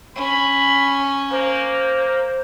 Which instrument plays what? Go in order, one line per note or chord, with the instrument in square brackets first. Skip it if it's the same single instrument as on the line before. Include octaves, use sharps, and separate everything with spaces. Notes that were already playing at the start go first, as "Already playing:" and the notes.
[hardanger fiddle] C#4 [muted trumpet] B5
[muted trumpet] A#3 [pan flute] C5